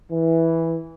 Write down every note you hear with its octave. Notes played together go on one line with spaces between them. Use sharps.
E3